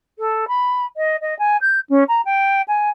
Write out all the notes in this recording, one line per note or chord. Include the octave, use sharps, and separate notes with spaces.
A4
B5
D#5
D#5
G#5
G6
C#4
A#5
G5
G#5